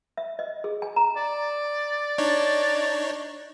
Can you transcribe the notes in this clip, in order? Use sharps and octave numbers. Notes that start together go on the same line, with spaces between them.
E5
D#5
G#4
G#5
A#5
D5
D4 D#4 C#5